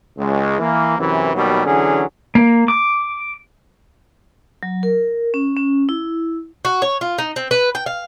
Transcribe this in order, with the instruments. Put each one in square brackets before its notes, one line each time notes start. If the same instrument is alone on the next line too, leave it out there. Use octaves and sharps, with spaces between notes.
[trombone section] C#2 G#3
E3 A#3
F#2 C3 E3
D#2 B2 D#3 F#3 G3
D3 E3 F#3 C#4 G#4
[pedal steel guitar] A#3
D6
[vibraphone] F#3
A#4
C#4
C#4
E4
[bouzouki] F#4
C#5
F4
D#4
C4
B4
G5
F5